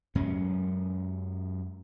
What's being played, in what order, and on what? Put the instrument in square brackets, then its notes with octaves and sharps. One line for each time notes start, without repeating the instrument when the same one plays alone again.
[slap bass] F#2 F#3 G#3 C#4